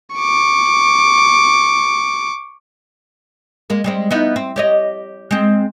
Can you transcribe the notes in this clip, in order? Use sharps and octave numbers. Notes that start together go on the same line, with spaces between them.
C#6 D6
G#3 A#3
G3 G#3 C4
B3 D#4 E4
C4
G4 C#5 D#5
G#3 C4